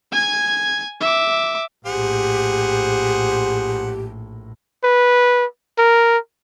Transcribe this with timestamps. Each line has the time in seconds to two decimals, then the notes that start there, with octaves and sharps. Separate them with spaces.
0.12 G#5 G#6
1.00 E5 D6
1.86 A#1 A2 G4 G#4 C5 F#5
4.84 B4
5.78 A#4